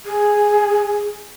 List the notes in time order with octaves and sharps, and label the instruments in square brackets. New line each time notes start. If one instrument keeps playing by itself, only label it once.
[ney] G#4